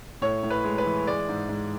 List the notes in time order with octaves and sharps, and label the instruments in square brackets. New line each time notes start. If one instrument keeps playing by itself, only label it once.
[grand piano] A2 C#5
A2
B4
G#3
B4
E3
G#3 D5
G#2
G#2